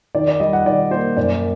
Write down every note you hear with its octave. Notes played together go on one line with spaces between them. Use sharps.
D#3 D5
D5
G3 D#5
F#5
D#3 D5
A#3 C5
F#2 D5